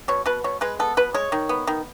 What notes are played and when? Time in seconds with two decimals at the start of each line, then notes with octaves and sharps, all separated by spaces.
0.08 B2 C#5
0.26 B2 B4
0.44 B2 C#5
0.61 G#3 B4
0.79 B3 A4
0.97 B2 B4
1.14 G#3 C#5
1.32 D#3
1.49 B3
1.67 D#3